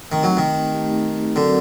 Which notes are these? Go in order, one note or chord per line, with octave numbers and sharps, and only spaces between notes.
D#3 A3 C4 D#4 G4
F#3
D#3
A3 C4 D#4 G4
D3 F#3 C4 F#4 A#4 D5